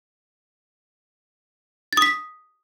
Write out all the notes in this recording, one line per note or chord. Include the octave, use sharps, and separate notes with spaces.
D#6 A6 B6